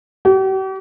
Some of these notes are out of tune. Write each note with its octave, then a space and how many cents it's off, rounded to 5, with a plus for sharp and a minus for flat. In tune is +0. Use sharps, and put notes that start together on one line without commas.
G4 -45